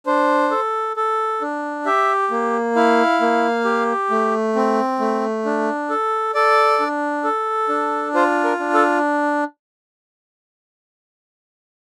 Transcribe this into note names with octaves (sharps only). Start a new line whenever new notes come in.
D4 C5
A4
A4
D4
G4 E5
A#3
E4 F5
A#3
G4
A3
C4
A3
D4
A4
A4 D5
D4
A4
D4
F4 C5
A#4
D4
A4